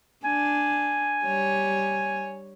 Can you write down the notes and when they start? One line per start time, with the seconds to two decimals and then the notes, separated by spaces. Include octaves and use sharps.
0.24 D4 G#5
1.24 G3 C#5